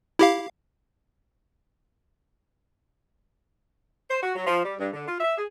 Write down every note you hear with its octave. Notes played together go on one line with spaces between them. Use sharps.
E4 G4 F5
C5
F#4
F#3
F3
G3
G2
D3
F4
E5
G#4